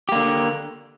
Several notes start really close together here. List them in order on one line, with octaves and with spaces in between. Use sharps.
G4 A#3 D3